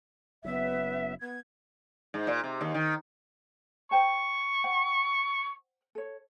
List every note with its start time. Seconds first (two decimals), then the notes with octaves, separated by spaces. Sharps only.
0.45 F#1 F#2 B3 E5
1.21 B3 G#6
2.14 G#2
2.27 A#2
2.44 C3
2.61 D#2
2.74 D#3
3.91 C5 G5 A5 C#6
4.64 C5 F#5 G5
5.95 A4 C#5